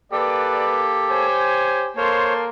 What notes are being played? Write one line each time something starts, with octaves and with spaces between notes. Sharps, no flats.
A#3 G4 A4 B4 D5
C5 C#5 G#5
A#3 A4 C5 C#5 A5 C6